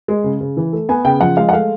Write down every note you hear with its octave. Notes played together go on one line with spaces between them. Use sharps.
G#3
C#3
C#3
E3
A3
B3 G#5
C#3 G5
F3 F#5
G#3 F5
F#5
A3 F5